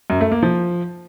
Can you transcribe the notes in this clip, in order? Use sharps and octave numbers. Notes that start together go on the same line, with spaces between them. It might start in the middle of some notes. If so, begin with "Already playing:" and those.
F#2
A3
A#3
F3